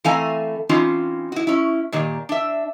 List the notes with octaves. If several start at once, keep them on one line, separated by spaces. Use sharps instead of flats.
E3 A3 C4 F5 G#5 A#5
E3 C4 C#4 D#4 F4
E4 F#4
C#4 E4
A#2 D#3 A#3 G4
D4 E5